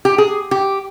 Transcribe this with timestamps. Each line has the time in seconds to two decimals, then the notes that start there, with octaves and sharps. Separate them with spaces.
0.05 G4
0.18 G#4
0.51 G4